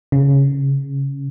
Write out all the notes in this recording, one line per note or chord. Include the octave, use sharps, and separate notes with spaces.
C#3